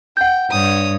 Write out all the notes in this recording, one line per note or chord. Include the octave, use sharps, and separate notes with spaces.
F#5 G5 G6
G2 C#5 D#6